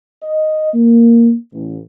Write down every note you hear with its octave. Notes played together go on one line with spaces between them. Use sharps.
D#5
A#3
A1